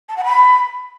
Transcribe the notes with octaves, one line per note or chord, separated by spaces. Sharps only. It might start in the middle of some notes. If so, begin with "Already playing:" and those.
A5
F#5
B5